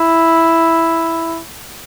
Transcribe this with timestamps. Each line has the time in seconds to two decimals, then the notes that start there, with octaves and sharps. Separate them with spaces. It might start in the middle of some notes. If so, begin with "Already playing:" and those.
Already playing: E4